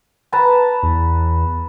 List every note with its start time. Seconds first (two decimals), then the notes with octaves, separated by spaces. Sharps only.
0.32 B4 A5 A#5
0.83 E2